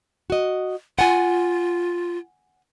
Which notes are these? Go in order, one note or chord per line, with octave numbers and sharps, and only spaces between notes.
F#4 D#5
F4 F#5 G#5